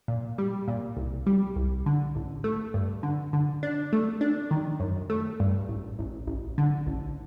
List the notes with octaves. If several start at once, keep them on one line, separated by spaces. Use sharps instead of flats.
A#2
G3
A#2
C2
G3
C2
D3
A1
A3
G2
D3
D3
D4
A3
D4
D#3
F#2
A3
G2
A1
A1
A1
D3
A1